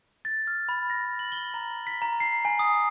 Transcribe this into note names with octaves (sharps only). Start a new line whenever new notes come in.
A6
F6
B5
A#6
F#7
G7
A#5
B6
A#5
C7
G#5
D#6